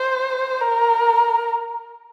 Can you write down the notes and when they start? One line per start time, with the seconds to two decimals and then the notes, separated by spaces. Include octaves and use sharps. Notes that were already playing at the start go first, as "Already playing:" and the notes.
Already playing: C5
0.60 A#4